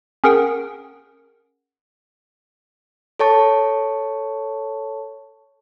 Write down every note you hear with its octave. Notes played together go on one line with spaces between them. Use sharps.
C#4 G#4 A#4 F#5 G5
A4 C#5 A5 C#6